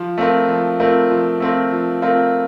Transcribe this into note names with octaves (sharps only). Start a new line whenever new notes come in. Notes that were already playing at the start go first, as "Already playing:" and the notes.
Already playing: F3
A3 C4 F4 A#4
F3
A3 C4 F4 A#4
F3
A3 C4 F4 A#4
F3
A3 C4 F4 A#4